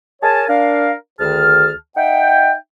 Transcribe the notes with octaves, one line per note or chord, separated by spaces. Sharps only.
G#4 A#4 C#5 G#5 A5
D4 A#4 F5
D2 D#3 G#4 A5 F6
D#4 E5 F#5 G5